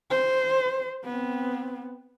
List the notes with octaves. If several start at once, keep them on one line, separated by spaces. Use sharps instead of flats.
C5
B3 C4